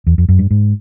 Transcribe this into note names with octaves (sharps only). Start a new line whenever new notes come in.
E2
F2
F#2
G2
G#2